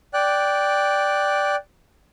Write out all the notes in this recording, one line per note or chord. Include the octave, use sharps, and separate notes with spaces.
D5 G5 F#6